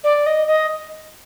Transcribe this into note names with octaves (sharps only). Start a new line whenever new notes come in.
D5
D#5
D#5